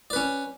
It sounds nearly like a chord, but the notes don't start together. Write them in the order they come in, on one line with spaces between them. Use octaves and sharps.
D5 B4 C#4